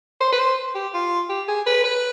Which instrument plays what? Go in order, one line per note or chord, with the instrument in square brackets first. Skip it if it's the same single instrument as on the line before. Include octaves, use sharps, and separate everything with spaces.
[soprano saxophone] C5
B4
C5
G4
F4
G4
G#4
B4
B4